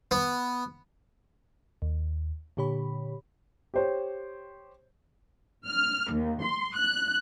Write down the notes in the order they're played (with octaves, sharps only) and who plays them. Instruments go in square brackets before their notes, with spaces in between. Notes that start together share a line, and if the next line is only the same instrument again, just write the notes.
[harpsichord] B3
[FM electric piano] D#2
A#2 D3 G4 C#5 B5
[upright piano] G4 C5 C#5
[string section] F6
D#2
C6
F#6